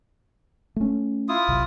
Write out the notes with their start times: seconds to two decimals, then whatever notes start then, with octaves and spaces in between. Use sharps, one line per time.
0.76 A3 C#4
1.29 E4 F4 D#6
1.48 B1 C3